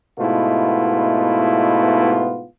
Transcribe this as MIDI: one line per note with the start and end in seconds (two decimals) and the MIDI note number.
0.19 2.45 44
0.19 2.45 47
0.19 2.45 57
0.19 2.45 59
0.19 2.45 64
0.19 2.45 65